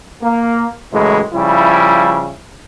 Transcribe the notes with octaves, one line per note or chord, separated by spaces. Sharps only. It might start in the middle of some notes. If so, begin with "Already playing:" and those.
A#3
F#2 A2 C#3 E3 G#3
C#3 F3 G3 E4